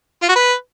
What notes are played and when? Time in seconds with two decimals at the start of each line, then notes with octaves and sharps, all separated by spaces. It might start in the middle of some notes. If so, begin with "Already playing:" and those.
0.22 F4
0.29 F#4
0.35 B4